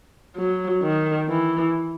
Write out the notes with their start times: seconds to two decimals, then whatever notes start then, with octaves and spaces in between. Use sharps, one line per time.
0.36 F#3
0.83 D#3
1.29 E3